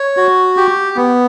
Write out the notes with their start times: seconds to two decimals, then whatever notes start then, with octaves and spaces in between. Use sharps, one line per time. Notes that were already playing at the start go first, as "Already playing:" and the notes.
Already playing: C#5
0.17 F#4
0.57 G4
0.96 B3